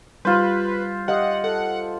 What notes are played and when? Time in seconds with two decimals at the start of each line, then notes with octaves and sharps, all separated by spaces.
0.25 G3 F4 B4 C5
1.08 G4 D#5 F5 F#5
1.44 A4 F#5